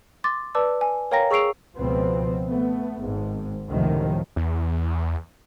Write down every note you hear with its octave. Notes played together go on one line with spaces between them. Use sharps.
C6 D6 A6
B4 D5 A5 D6 E6
G#5
A#4 C#5 F5 G5 A#5 A#6
G#4 C#6 E6 C7 D7 F7
C#2 B2 F3 B3 C4
A3 B3
G#1 G#2
C#2 F#2 A2 C3 D#3 F3
E2